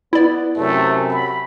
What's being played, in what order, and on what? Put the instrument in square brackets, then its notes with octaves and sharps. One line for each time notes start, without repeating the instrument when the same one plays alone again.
[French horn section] B3 [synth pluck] E4 D5
[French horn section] F#2 C3 [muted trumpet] A3
[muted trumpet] B5